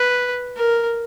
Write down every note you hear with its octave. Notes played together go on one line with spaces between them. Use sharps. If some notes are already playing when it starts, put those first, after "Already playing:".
Already playing: B4
A#4